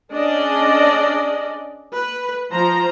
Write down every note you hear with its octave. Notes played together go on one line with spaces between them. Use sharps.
C#4 D4 G#4 D5 D#5
B4
F3 C5 A#5